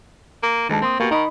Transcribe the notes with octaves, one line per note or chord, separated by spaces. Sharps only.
A#3
D2 D#3 G#3 A5
A#3 C4 C6 D#6
B2 A#3 G4
D#3 D#4 D#5 B5